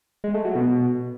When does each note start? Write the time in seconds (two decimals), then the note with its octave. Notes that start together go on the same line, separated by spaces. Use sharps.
0.24 G#3
0.34 A3
0.45 F#3
0.55 B2